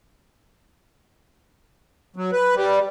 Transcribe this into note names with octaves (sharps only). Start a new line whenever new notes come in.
F#3
B4
G3